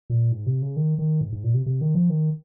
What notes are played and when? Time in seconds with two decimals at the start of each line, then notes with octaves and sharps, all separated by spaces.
0.10 A#2
0.32 G#2
0.46 C3
0.62 C#3
0.76 D#3
0.98 D#3
1.21 G#2
1.32 G#2
1.44 A#2
1.54 C3
1.66 C3
1.81 D#3
1.95 F3
2.10 D#3